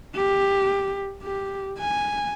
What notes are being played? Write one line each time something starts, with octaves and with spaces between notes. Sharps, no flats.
G4
G4
G#5